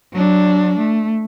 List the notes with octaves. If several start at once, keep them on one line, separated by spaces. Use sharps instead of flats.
F#3 D4
A3